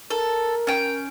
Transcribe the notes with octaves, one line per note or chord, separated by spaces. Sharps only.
A4 A#4
C#4 G5